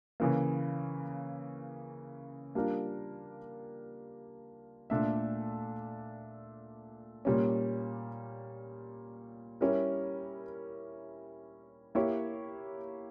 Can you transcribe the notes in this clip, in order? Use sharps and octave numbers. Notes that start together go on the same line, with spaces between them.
C#3 E3 A#3
G3 A#3 D4 F4 A#4
A#2 A3 D4 A4 E5
A#2 G3 A#3 C#4
G3 C#4 E4 G4 A#4
A#3 E4 G4 C#5